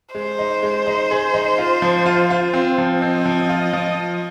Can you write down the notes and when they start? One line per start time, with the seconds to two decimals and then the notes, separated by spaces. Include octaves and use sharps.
0.15 G#3 C5
0.39 D#4
0.63 G#3
0.87 D#4
1.11 G#4
1.34 D#4
1.58 F4
1.82 F3
2.06 F4
2.30 F4
2.54 C4
2.78 F3
3.01 C4 D#5
3.26 F3
3.49 F4
3.73 F3